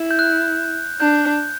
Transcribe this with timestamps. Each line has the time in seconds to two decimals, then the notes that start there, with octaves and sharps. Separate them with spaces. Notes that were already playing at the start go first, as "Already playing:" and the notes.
Already playing: E4
0.11 G6
0.19 F#6
1.00 D4 G6